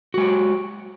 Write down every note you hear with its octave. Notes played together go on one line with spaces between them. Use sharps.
G#3 F#4 G4